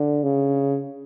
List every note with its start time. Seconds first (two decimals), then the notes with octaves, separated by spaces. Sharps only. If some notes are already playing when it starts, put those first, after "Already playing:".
Already playing: D3
0.23 C#3